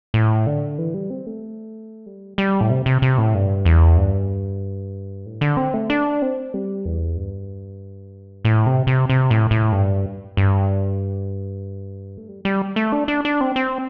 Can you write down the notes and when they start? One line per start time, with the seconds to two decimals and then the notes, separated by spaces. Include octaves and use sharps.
0.14 A2
0.47 D3
0.78 E3
0.94 G3
1.10 C4
1.27 A3
2.06 G3
2.38 G3
2.61 A2
2.70 C3
2.86 C3
3.02 C3
3.18 A2
3.34 G2
3.65 E2
3.97 G2
5.26 A2
5.41 D3
5.57 C4
5.74 A3
5.90 D4
6.22 C4
6.54 G3
6.85 E2
7.17 G2
8.45 A2
8.66 C3
8.87 C3
9.10 C3
9.31 A2
9.51 A2
9.72 G2
10.37 G2
12.17 A3
12.29 G3
12.45 G3
12.76 A3
12.92 D4
13.08 D4
13.25 D4
13.41 C4
13.56 C4